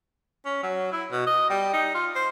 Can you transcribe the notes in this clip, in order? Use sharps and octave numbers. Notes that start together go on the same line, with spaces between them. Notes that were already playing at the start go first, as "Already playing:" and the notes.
C#4
F#3
E4
B2
D#5
G3
D#4
F4
C5